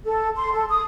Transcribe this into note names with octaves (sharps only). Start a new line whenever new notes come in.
A4
C6
A4
D#6